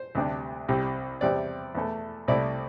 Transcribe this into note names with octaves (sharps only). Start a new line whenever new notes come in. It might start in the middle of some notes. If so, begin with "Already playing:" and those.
Already playing: C5
D2 C3 G3 D4
C2 C3 G3 C4
E2 C3 G3 C4 D5
E2 E3 A3
C2 C3 A3 E4 D5